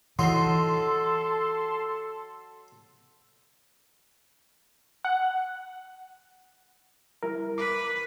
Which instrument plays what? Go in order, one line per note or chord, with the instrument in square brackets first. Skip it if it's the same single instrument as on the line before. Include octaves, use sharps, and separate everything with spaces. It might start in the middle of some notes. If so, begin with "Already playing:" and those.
[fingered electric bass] E3 [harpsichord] F#3 D#4 [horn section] A4 [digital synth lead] C6
[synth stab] F#5
[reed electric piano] G3 E4 A#4
[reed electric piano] A#4 D6 [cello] B4